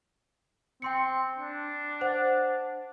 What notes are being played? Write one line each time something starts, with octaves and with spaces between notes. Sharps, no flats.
C4 G5 C6 C#7
D4
C5 F#5